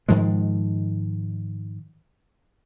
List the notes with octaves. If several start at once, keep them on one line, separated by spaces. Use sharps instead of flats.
G#2 D#3 F3 G#3